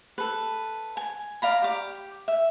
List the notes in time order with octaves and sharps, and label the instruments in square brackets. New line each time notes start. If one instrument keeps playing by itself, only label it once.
[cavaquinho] A4 B4
G#5
D5 F5 A#5 B5
G4 D6
E5